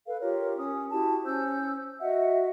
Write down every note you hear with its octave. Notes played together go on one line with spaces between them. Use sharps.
A4 B4 F5
F4 G4 A#4 C#5
C#4 D#6
E4 F#4 G4 A5
C#4 C5 E6 G6
F#4 D#5 E5 F#5